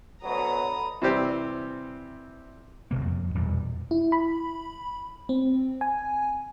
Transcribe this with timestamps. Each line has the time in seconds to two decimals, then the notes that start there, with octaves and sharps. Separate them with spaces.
0.24 D2 B2 F#3 A4 A#5 B5 D#6
1.02 C3 E3 G3 C4 G4 C5
2.91 D1 F#2 C3 A#3
3.06 F2
3.35 E1 E2 A#2 G3
3.91 E4
4.12 B5
5.29 C4
5.81 G#5